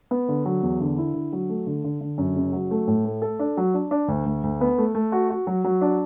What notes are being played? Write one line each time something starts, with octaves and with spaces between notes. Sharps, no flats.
B3
D3
F#3
E2
D3
E4
D3
F#3
A3
D3
D3
D3
F#2
F#1
F#3
A3
A2
A3
A4
D4
F#3
D4
D4
D2
D2
D2
B3
A3
A3
F#4
F#4
F#3
F#3
D4